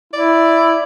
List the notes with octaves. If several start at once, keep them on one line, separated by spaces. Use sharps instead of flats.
E4 D5